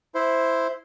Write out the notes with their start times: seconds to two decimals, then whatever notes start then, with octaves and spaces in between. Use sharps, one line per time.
0.15 E4 C5